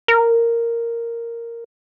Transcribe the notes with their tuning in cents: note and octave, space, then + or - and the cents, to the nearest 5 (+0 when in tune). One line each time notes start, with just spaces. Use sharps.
A#4 -5